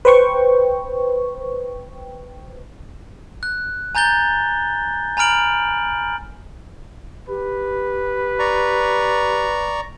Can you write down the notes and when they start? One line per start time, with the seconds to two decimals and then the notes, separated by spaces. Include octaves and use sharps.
0.05 B4 C5 G5 C#6
3.43 F#6
3.95 G#5 A#5 G6 A6 G7
5.17 G#5 A#5 B5 F6 D7 F#7
7.29 G4 B4
8.39 D5 A#5 C#6